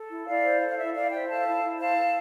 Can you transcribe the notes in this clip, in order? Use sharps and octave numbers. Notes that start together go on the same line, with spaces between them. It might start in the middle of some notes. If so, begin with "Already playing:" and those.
Already playing: A4
E4
E4 D5 F5
C5
A4
F5
E4 E5
E4 D5 F5
C5 E5 G5
A4 F5 A5
E4
E4
C5 F5 A5
A4